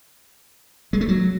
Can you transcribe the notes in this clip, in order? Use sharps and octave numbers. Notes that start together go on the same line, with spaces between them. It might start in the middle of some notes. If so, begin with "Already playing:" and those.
G#3
A3
F#3